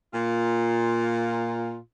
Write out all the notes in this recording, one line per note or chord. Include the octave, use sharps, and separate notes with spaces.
A#2 F4